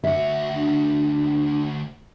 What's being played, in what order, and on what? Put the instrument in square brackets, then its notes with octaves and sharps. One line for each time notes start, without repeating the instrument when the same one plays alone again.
[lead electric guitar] D2 F#4 [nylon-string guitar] E5
[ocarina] D4